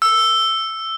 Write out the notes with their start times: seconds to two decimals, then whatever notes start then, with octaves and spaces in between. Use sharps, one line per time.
0.02 E6